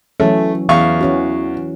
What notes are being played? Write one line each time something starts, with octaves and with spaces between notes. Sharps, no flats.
E3 F#3 A3 C#4
E2 E3 F5 C#6
E3 C#4 F#4